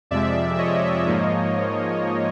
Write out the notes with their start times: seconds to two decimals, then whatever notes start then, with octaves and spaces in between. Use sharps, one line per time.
0.11 F2 C3 F3 G#3 D5 E5
0.58 C#5 D#5
1.06 G#2 F3 A#3